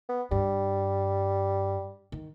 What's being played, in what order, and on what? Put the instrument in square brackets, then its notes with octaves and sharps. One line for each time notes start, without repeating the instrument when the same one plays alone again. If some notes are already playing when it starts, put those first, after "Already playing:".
[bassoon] B3
[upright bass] G2 [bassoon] G3
[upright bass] D#3